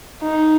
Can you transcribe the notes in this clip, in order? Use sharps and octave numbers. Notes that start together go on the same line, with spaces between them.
D#4